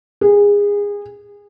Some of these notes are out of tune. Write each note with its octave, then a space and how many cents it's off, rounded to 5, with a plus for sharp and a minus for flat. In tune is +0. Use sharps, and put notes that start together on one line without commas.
G#4 -25